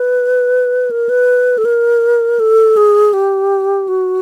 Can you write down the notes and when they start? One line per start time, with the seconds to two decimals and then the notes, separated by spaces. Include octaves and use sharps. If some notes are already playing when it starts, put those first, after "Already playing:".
Already playing: B4
0.91 A#4
1.09 B4
1.58 A4
1.65 A#4
2.40 A4
2.77 G#4
3.13 G4
3.88 F#4